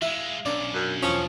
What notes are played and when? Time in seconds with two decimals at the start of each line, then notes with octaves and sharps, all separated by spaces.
0.02 E3 G#3 E4 F5
0.46 B1 C#4 D4 A#4 D5
0.74 F#2
1.02 E2 F3 C#4 D#6